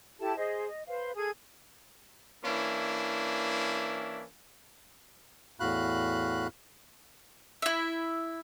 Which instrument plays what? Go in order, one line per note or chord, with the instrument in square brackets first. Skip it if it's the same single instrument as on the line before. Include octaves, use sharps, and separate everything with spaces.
[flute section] E4 G4 A4 A5
G#4 C5 D#5
D#5
B4 C5 F5
G#4 A4 G#6
[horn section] E3 A#3 C#4 D4 E4
[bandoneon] E2 A2 F#4 F5 B5 F#6
[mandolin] E4 E5